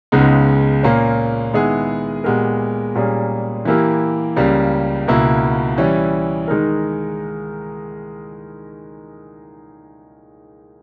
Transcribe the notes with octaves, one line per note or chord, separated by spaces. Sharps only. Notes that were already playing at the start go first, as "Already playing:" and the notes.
C#2 C#3 G#3 B3 D#4
A#2 A#3 C#4
D#3 G#3 B3 E4 G#4
A#2 G#3 B3 G4 A#4
A#2 G3 A#3 C#4 G#4
E3 A#3 E4 G4 A#4
C#2 C#3 G3 A#3
C#2 B2 A#3 E4
E3 G3 C#4 E4
D#3 G#3 D#4 A#4